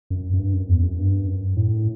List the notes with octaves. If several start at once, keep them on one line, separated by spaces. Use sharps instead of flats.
F#2
F#2
G2
F#2
E2
F#2
G2
F#2
A2